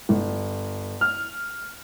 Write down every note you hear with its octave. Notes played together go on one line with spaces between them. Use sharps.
G1
F6